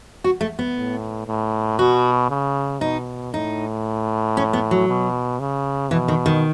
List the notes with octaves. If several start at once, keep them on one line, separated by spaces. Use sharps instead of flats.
F#4
A3
B3
A2
A2
B2 F#4
C#3
B2 D#4
A2 D#4
C#4
B3
F#3
B2
C#3
B2 E3
D#3
D#3